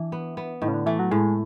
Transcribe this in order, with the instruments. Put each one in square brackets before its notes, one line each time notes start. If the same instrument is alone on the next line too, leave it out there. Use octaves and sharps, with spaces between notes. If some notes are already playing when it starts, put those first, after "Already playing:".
Already playing: [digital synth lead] E3 [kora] D4
[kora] B3
B3
[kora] A2 [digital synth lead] D#3
[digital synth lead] C#3
D3
[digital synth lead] E3 [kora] A3
[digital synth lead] F#3
[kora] A2 [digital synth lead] G#3